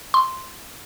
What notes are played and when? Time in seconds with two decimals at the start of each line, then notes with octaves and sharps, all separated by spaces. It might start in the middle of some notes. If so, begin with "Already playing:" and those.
0.14 C6